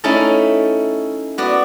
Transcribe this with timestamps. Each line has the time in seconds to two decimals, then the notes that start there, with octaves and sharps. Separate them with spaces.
0.04 A3 C#4 D#4 E4 A5
1.38 B3 F#4 D5